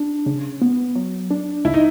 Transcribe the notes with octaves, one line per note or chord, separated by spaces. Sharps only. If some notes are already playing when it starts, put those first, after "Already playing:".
Already playing: D4
C#3
B3
F#3
D4
C#2 E4
D#4